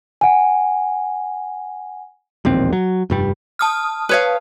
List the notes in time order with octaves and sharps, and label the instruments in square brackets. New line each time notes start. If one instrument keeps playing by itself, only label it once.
[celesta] F#5 G#5
[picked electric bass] E1 A#1 D#2 C4
F#3
F1 G2 G3
[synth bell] A5 D#6 F6
[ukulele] B4 C#5 F5